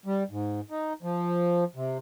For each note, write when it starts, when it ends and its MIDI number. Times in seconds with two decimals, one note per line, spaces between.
0.06 0.23 55
0.31 0.60 44
0.70 0.93 63
1.03 1.64 53
1.75 1.98 48